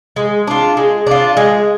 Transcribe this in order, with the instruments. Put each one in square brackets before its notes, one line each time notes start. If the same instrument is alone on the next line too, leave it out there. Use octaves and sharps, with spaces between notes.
[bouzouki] G#3
D4 F4
G#3
D4 F4
G#3